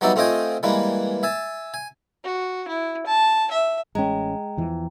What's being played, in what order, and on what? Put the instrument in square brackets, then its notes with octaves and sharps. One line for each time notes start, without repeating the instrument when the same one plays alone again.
[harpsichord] F#3 G3 B3 D#4 D5 E5
A3 C4 F4 D#5 G5 G#5
E3 G3 G#3 A#3 B4
E5 G#5 A5
G#5
[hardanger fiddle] F#4
E4
A5
E5
[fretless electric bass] A1 C#4 [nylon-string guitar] G#3 [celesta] G5 A#5
[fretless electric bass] E2 E3 F3